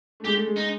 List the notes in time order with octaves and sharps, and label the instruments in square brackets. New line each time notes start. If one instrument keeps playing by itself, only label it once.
[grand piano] A3
[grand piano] G#3 [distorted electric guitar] G4
[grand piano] A3
G#3
[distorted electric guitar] D#4